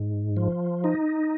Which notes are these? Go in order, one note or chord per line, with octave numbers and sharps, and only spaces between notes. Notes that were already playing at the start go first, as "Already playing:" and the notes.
Already playing: G#2
F3
D#4